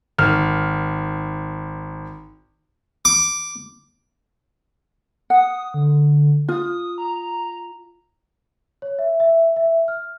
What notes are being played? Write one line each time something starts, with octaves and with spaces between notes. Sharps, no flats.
G#1 F6
D6
F#5 D#6
D3
F4 D#6
A#5
C#5
E5
E5
E5
F6